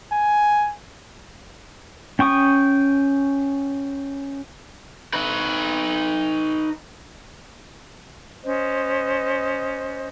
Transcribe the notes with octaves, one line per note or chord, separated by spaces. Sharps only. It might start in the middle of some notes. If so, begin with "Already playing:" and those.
G#5
C#4 G5 C#6 D#6
D#4 B4
C#4 C5 D#5